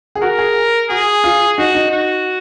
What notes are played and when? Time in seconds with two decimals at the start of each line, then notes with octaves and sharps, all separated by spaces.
0.15 G#4
0.22 F#4 A#4
0.38 G#4
0.89 F#4 G#4
1.24 F4
1.58 D#4 F#4
1.75 D#4
1.91 F#4